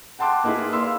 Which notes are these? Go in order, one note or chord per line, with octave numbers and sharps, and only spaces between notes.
F#5 G5 A5 C6 D6 F#6
A#3 D#4 E4 G#4 B4
D5 F5 B5 C6 E6